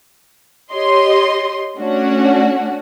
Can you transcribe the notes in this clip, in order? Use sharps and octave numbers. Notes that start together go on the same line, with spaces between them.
G4 C#5 D#5 C6
A3 C#4 D4 F#4